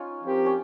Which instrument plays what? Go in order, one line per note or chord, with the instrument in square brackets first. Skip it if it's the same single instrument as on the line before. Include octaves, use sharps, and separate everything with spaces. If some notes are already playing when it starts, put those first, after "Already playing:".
Already playing: [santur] C#4 D#4 F4
[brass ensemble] F3 C4 G4 A#4
[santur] C#4